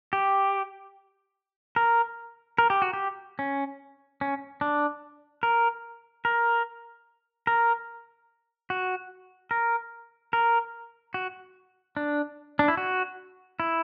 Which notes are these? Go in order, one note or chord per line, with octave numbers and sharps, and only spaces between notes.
G4
A#4
A#4
G4
F#4
G4
C#4
C#4
D4
A#4
A#4
A#4
F#4
A#4
A#4
F#4
D4
D4
E4
F#4
E4